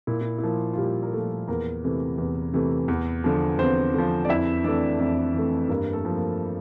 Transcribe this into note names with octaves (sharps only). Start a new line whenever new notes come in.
A#2 E4
E4
E4
F3 A#3 F4
F4
A#2 G3 G4
A#4
F3 A3 A#3 A4
E2 A#3 A#4
C3 E3 A3
E2
C3 E3 A3
E2
D3 F3
E2 C4 C5
D3 F3
D5
F2 E4 E5
E3 A3 D4 D5
F2
E3 A3
G2 A#3 A#4
A3 A4
F3 A#3
A#3 A#4